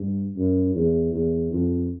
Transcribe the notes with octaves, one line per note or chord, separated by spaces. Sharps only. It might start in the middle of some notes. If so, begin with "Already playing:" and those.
Already playing: G2
F#2
E2
E2
F2